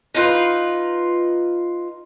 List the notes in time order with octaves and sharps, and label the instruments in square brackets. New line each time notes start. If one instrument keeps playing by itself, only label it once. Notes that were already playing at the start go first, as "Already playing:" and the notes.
[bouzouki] D#4 F4 B4